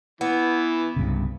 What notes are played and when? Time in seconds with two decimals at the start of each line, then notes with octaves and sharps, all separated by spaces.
0.21 E3 B3
0.96 C2 G2 C#3